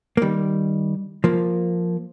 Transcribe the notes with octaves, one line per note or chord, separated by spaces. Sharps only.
A#3
D#3 G3
F3 A#3